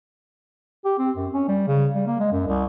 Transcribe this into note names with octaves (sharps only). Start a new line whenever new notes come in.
G4
C4
F#2
C#4
G3
C#3
G3
A#3
G#3
F#2
C2